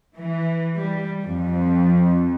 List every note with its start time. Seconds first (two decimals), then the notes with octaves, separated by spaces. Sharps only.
0.16 E3
0.77 G3
1.24 F2